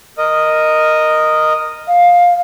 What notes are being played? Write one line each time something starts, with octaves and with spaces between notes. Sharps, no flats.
A#4 D#5
F5